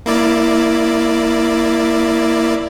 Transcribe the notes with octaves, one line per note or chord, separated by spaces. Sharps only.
A#3 E4 D5